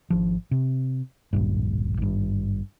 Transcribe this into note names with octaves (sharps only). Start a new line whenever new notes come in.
G#1 F3
C3
D1 A#1 G2
G#1 G2